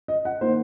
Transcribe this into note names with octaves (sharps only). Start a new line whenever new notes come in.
D#5
F#5
D#3 A#3 C5